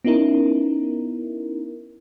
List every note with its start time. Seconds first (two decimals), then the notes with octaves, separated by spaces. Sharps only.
0.05 B3 C#4 D#4 E4 A#4